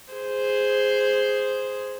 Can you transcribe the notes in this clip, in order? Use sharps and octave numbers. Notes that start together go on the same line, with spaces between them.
G#4 C5